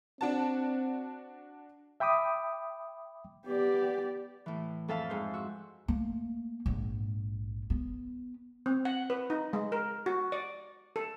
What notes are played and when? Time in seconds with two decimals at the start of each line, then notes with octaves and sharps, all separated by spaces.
0.21 C4 D4 F#4 A5
2.00 E5 G5 B5 D6 D#6
3.47 B3 G4 D5
4.46 A2 E3
4.88 F2 A4 E5 F5 A5
5.10 G#2 C5
5.33 F#4 E6
5.88 A3 A#3
6.66 A#1 G#2
7.70 B3
8.66 C4
8.85 F#5
9.10 B4
9.30 D#4
9.53 G#3
9.72 A#4
10.06 F#4
10.32 D5
10.96 A4